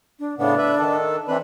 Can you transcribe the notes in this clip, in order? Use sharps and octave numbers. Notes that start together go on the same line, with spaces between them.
D4
A2 C#3 B3 D4
B4 E5
D#3 A4
E3 C4 D4 B4